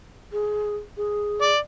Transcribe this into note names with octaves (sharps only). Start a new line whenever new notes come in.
G#4
G#4
D5